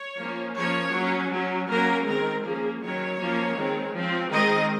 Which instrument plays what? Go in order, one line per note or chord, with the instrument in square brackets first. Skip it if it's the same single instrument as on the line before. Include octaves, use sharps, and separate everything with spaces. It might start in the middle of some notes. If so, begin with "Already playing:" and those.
Already playing: [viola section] C#5
F3 A#3 C#4
F3 A#3 C#4 C#5
F#3 C#4
F#3 C#4
F#3 A#3 C#4 A#4
D#3 G#3 C4 A#4
F3 A#3 C#4 G#4
D#3 F#3 C#4 C#5
F3 A#3 C#4
D#3 G#3 C4
F3 C4
D#3 G#3 C4 D#5